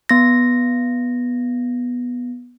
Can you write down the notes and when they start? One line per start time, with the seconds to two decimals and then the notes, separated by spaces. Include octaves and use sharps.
0.09 B3 A#6